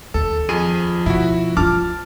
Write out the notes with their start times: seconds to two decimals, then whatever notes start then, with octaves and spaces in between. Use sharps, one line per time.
0.14 D#2 A4
0.49 F2 F3 G#4 D#7
1.06 B2 E4 F#4
1.57 E4 F4 A5 D6 F6